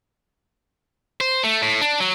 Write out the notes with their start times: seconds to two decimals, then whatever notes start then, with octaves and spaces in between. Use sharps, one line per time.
1.21 C5
1.44 A3
1.62 A2
1.81 D4
2.00 F#3